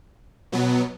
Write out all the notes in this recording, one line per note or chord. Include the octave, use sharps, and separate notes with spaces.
B2 F#3 B3